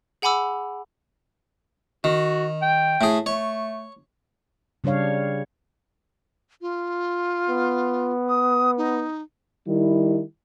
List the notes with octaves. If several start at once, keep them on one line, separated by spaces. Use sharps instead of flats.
G#4 F#5 G#5 B5 D6 E6
D#3 F#4
G5
A2 G#4
A3 C#5
C#3 G3 D4 C#5 F5
F4
B3
D#6
D#4
D#3 G3 E4